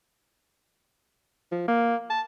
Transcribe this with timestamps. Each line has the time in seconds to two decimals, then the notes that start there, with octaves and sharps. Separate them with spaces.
1.52 F3
1.68 A#3
2.10 A5